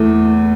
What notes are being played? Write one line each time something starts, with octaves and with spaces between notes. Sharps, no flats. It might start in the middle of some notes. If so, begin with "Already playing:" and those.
Already playing: E2 E3 A3